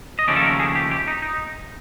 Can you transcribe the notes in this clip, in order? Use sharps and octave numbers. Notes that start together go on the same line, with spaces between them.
D#5
D#2 C#3 F3 A3 C#4 D5
A4
A#4
G#4
G4
G4
D#4
D#4